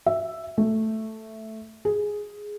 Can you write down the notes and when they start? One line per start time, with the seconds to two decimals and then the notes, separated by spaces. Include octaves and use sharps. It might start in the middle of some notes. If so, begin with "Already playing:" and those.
0.06 E5
0.58 A3
1.85 G#4